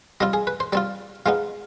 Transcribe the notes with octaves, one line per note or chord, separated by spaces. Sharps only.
G3 C4 F4 D#5
G#4
B4
C5
G3 C4 F4 D5
F3 G#3 B3 D#4 F5